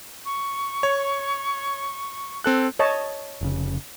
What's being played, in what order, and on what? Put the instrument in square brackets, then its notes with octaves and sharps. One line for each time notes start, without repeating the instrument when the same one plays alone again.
[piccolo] C#6
[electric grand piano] C#5
C4 A4 F#6
[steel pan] C#5 D#5 A5
[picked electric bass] F1 C#3